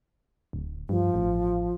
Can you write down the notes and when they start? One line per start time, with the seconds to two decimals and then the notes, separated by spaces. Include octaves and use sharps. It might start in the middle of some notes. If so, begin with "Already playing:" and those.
0.53 D1
0.89 G2 F3
1.14 A1